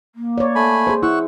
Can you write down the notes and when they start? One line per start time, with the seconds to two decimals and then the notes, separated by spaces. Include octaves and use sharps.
0.15 A#3
0.38 C#5 D5
0.55 A3 G#5 B5
0.87 G#4 C5
1.03 E4 F#5 C#6 E6